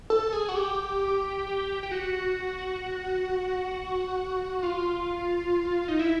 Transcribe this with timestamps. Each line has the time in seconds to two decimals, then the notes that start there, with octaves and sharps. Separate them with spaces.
0.10 A4
0.33 G#4
0.49 F#4
0.55 G4
1.83 G4
1.91 F#4
4.63 F4
5.88 D#4
5.99 E4